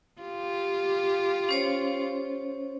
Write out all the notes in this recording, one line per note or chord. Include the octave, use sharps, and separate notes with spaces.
F4 G4
C#4 C5 C#5